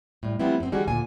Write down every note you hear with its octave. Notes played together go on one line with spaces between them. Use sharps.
A2 G3
F3 G3 A3 B3 C4 E4
F#2 C4
D#3 G3 F#4 G#4
D2 A#2 G#5